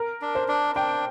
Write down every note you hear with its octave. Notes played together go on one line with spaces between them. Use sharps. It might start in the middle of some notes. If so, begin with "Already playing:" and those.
Already playing: A#4
D4
C5
D4
D4 G5